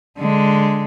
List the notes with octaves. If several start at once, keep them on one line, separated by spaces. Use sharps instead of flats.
D3 G#3